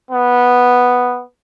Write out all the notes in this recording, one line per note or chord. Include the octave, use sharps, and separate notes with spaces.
B3